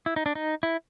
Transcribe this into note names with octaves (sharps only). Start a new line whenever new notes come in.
E4
D#4
D4
D#4
E4